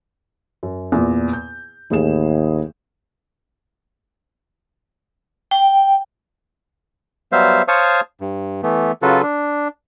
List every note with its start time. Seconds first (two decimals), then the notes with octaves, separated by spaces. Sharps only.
0.63 F#2
0.92 E2 A#2
1.33 G6
1.91 A1 D#2 G#4 E7
5.51 G5
7.32 F#3 G3 B3 C5 E5 F5
7.68 C5 C#5 F5 A5 C#6 D#6
8.21 G2
8.63 E3 A3 B3
9.02 C#3 F#3 F4 F#4 A4 B4
9.22 D4